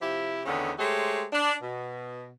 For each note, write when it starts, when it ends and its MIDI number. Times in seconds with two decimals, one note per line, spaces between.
0.01 0.41 48
0.01 0.41 53
0.01 0.41 64
0.01 0.41 67
0.46 0.72 40
0.46 0.72 50
0.46 0.72 51
0.46 0.72 59
0.46 0.72 61
0.78 1.23 56
0.78 1.23 57
0.78 1.23 67
0.78 1.23 72
0.78 1.23 73
1.33 1.53 62
1.62 2.30 47